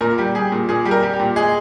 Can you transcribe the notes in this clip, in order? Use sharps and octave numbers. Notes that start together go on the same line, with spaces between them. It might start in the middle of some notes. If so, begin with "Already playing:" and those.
A#2 A#4
G3
G3 G#4
A#2
A#2 G#4
G3
A#4
G3
G4
A#2
G#3 G#4